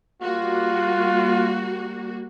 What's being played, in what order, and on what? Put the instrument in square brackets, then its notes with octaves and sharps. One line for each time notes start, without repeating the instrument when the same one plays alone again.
[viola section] G3 A#3 F#4 [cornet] F4